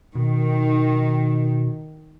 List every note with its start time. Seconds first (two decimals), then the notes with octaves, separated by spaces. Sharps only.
0.15 B2 D#3